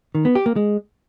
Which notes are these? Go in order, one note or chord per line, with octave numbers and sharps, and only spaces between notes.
D#3
B3
G4
A#3
G#3